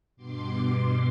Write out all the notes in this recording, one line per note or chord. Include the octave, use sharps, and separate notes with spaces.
G2 B2 C6 D6